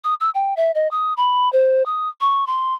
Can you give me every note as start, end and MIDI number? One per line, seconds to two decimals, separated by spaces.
0.04 0.14 87
0.20 0.30 88
0.35 0.54 79
0.57 0.72 76
0.75 0.90 75
0.91 1.13 87
1.17 1.51 83
1.52 1.85 72
1.86 2.09 87
2.21 2.47 85
2.47 2.74 84